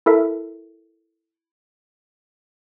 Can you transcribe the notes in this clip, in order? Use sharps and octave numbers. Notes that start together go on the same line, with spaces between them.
E4 A4 A#4 E5